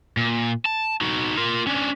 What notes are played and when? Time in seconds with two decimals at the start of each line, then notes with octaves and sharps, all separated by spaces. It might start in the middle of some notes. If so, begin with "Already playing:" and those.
0.17 A#2
0.65 A5
1.01 D#4 F#4
1.37 F4 A#4
1.67 C#4 D4